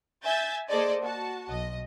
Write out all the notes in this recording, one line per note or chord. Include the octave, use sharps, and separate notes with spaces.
E5 G#5 G6 A6
A#3 G#4 A4 C5 D5 D#5
F#4 A5
B1 D#5